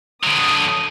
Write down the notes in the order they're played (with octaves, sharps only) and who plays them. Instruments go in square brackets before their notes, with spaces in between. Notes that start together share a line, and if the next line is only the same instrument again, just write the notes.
[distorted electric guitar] D3 F#3 [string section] D#6